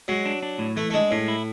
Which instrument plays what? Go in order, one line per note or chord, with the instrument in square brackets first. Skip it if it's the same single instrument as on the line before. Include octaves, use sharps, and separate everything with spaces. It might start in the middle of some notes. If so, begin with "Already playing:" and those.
[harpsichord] F#3 [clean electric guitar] G#3
[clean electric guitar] D4
D4
A2
[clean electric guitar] E3 [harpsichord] A3
[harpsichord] A3
[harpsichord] G#3 [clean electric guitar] D4
[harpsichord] A2 [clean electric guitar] G#3
[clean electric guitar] E4